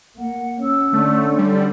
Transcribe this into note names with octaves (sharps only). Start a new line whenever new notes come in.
A#3 F#5
C#4 E6
D3 A3
G3